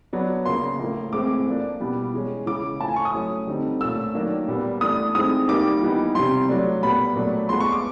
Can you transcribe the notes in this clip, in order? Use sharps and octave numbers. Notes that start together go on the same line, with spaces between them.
F#3 B3 D4
C#3 F3 A#3 C6
A2 F3 A#3
A2 E3 G#3 C4 D6
F3 A#3 D4
B2 G3 B3 E4
E3 G#3 C#4
C#3 E3 G#3 C#4 E4 D6
A2 F3 A3 A5
G#5
C#6
D#6
F#3 A3 C#4 E4
D3 G3 C4 D#4
A#2 F3 A3 C#4 E6
D#3 F#3 A#3 D4
A#2 G3 B3
E3 A3 D4 D#6
D#3 G#3 C4 E4 D#6
D#3 G3 A#3 D6
E3 G3 B3 D#4
C3 E3 G3 C6
F#3 A3 D4
A#2 G3 B3 B5
A#2 F#3 A3 D4
F3 G#3 B3 C6
C#6
D6